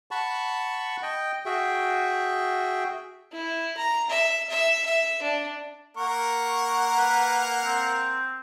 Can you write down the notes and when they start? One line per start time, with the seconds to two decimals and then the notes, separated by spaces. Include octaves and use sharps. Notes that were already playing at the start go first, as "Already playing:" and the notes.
0.11 F#5 A5 B5 C#6
1.03 D#5 G5
1.46 F#4 G#4 E5 G5
3.32 E4
3.77 A#5
4.10 E5
4.50 E5
4.86 E5
5.22 D4
5.97 A#3 A#4 F#5 C#6
6.96 B4
7.65 C4